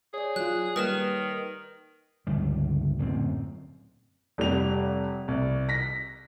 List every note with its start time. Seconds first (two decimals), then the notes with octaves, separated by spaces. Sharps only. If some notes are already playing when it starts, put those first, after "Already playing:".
0.14 G#4 C#5 D5
0.36 F#3 F4 F#6
0.76 D#3 G3 A#3 B4 F6 E7
2.27 G1 C#2 G3
2.99 D1 F#2 A#2 C4
4.38 F1 G3 F7
5.28 C2
5.69 A#6 B6